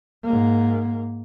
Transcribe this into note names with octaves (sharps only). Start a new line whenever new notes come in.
G#2 A#3